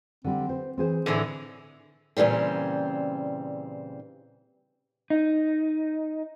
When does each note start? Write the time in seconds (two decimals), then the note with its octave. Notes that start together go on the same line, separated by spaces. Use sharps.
0.24 D3 G3 C4
0.49 C5
0.77 E3 C4 G#4 C5
1.06 A2 D3 E3 G#3
2.17 A#2 C#3 E3 G3 C4
5.10 D#4